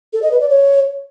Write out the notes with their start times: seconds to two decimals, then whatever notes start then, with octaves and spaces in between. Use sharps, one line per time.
0.13 A4
0.22 D#5
0.31 B4
0.40 D5
0.50 C#5